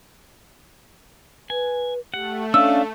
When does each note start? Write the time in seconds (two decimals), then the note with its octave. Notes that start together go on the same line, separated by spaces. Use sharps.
1.50 B4 G#5
2.14 A3 G4 F#5
2.54 C#4 D4 F5 E6